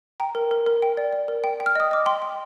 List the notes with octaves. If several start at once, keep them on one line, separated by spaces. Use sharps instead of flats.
G5 A#5
A#4
A#4
A#4
G5
D5
D5
A#4
G5
G5
F6
D#5 D#6
D#5 D6
G5 C6
G5